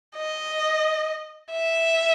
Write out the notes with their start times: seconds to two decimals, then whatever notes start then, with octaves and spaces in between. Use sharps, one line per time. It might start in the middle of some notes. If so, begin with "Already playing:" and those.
0.17 D#5
1.52 E5